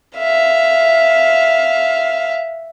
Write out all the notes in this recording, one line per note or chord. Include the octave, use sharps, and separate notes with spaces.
E5 F5